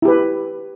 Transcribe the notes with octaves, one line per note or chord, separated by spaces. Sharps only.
E4 G4 B4